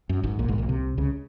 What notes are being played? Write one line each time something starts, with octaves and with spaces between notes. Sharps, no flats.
F#2
G#1 G#2
A#1 A#2
G#1 G#2
A#1 A#2
C2 C3
C#2 C#3